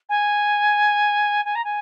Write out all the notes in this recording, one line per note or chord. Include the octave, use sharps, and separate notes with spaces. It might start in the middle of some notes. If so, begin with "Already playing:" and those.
G#5
G#5
A#5
G#5